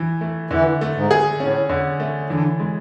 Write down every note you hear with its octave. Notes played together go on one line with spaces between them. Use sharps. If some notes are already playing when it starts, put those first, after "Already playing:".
Already playing: E3 E4
A3
D3 E3
A3
G#2
G#4
A2 C#4
D3
A3
D3 E3
G#3